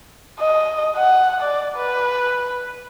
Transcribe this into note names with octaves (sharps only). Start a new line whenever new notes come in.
D#5
F#5
D5
B4